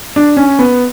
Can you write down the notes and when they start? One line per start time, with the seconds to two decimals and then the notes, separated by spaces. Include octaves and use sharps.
0.16 D4
0.37 C#4
0.59 B3